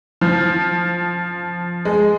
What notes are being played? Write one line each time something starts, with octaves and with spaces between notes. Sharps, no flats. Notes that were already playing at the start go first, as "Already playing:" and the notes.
F3
G#3